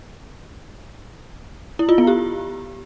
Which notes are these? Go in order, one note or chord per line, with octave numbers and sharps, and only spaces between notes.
E4
F4
B3
G4